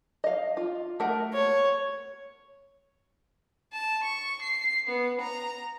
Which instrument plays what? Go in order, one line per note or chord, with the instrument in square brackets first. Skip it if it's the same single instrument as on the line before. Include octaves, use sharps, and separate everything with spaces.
[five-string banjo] D#5 F5
F4
A3 A#4 F#5
[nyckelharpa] C#5
[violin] A5
C#6
C7
B3
A#5